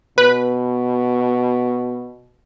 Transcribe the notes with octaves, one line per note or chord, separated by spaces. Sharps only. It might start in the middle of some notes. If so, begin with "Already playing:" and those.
B2 B4